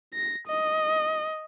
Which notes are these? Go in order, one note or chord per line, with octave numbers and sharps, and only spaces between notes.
A#6
D#5